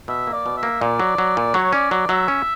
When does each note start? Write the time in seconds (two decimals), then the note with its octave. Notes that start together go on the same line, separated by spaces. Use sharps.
0.08 B2 E5
0.27 A#3
0.33 D5
0.46 B2
0.57 E5
0.63 A#3
0.81 A#2 D5
1.00 F#3
1.18 F#3
1.37 A#2
1.54 F#3 C#5
1.73 C#4 D5
1.91 F#3 D5
2.09 F#3 E5
2.28 C#4